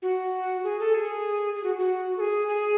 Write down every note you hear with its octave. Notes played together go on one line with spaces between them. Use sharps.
F#4
G#4
A4
G#4
G#4
F#4
F#4
A4
G#4
G#4